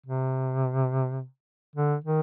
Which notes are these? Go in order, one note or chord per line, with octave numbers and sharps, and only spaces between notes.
C3
D3
D#3